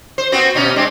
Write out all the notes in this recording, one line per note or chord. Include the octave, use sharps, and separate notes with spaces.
C5
B3 C4 F#4
B2 C#4 D#4
G#3 C4 D4